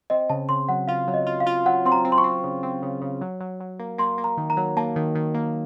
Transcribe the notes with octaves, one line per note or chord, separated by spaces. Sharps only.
C4 D#5
C#3 A5
C#3 C6
F#3 F#5
F4 F5
F#3
D#5
F4
F5
F4
F#3 F#5
C4 C6
A#5
C4
C6
C#6
C4
C#3
C4
C#3
C#3
F#3
F#3
F#3
A#3
A#3 C6
A#3
A#5
D#3
A#5
F#3
A#3 A5
D#3
D#3
A#3